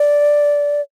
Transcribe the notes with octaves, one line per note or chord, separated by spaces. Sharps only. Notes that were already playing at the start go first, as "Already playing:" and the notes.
Already playing: D5